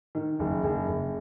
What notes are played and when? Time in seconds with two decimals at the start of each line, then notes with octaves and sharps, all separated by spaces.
0.15 D#3
0.39 F#1
0.64 F#1
0.88 F#1